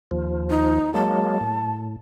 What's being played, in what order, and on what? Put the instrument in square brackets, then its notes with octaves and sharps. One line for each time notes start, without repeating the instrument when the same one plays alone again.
[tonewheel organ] D#2 F3
[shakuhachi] D#4
[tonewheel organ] F#3 G#3 A#3 [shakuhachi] A5
[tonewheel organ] A2